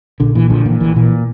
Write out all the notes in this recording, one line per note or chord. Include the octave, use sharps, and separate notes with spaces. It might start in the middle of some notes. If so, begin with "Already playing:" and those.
A#1 D3
A#2 E3
A#1 D3 F3
A#2 E3
A#1 E3
A#2 E3